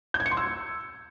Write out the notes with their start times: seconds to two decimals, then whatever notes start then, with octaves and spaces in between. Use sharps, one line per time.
0.14 G6
0.20 G#6
0.26 C#7
0.31 C6
0.37 E6